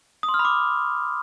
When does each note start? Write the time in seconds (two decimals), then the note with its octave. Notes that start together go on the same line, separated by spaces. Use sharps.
0.23 D#6
0.29 C6
0.34 F6
0.39 B5
0.45 D6